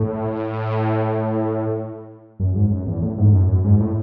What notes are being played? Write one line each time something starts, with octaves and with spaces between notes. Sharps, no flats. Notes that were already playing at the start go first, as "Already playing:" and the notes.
Already playing: A2
F#2
G#2
F#2
E2
A2
G#2
F#2
F#2
G#2
A2